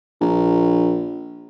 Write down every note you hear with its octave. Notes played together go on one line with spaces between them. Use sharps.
A#1